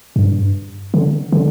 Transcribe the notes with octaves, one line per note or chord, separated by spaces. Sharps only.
G2
D3
D3